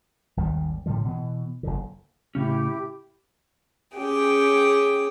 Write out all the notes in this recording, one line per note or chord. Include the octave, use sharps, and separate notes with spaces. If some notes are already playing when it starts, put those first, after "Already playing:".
G#1 D#2 D#3 G3
A2 D3 F3 G3
B2 E3
F#1 F2 D3
A2 C#3 C#4 E4 G4
C#4 G4 G#4 G5